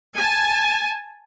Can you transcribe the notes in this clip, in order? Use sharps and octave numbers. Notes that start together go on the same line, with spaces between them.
G#5 A5